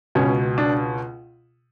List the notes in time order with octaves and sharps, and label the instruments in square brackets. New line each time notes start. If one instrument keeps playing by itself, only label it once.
[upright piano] C#2 B2 C#4
D4